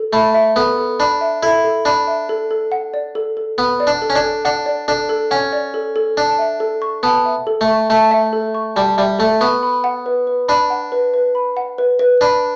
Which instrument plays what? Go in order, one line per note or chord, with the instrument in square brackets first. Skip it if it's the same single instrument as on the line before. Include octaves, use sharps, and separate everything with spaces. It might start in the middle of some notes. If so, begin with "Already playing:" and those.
Already playing: [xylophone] A4
[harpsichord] A3 [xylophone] B5
[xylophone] E5
[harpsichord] B3 [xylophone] A4
[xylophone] A4
[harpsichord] D4 [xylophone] B5
[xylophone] E5
[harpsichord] E4 [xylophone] A4
[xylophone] A4
[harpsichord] D4 [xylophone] B5
[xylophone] E5
A4
A4
F#5
D5
A4
A4
[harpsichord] B3 [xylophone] F#5
[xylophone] D5
[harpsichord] D4
[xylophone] A4
[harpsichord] C#4
D4
[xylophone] A4
[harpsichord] D4 [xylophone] F#5
[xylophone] D5
[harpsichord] D4 [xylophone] A4
[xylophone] A4
[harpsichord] C#4 [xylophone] F#5
[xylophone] D5
A4
A4
[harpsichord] D4 [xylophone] A5
[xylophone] E5
A4
C#6
[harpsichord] B3 [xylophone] A5
[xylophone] E5
A4
[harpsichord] A3
[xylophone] C#6
[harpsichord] A3 [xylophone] A5
[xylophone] E5
A4
C#6
[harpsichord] G3 [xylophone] A5
[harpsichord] G3 [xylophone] E5
[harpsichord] A3 [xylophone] A4
[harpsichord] B3 [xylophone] C#6
[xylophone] B5
F#5
B4
B4
[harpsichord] D4 [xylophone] B5
[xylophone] F#5
B4
B4
B5
F#5
B4
B4
[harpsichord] D4 [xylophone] B5